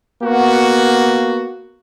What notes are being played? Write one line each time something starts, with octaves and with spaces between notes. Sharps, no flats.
A#3 B3 F#4